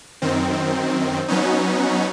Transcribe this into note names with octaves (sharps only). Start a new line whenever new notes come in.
F#2 D#3 C4
F#3 B3 C#4 D#4